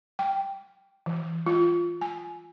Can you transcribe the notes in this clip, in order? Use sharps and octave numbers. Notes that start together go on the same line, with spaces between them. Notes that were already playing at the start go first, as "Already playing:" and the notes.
G5
E3
F4
G#5